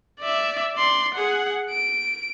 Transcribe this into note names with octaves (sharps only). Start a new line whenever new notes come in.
D5 E5
D5 C6
G#4 F#5
D7